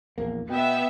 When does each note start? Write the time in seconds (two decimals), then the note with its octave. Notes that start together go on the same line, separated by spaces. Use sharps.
0.18 A#1 E2 A#3
0.50 B2 B3 E5 G5